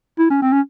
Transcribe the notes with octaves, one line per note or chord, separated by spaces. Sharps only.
E4
C#4
C4
C#4